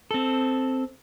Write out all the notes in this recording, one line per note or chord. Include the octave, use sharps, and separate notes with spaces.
C4 A4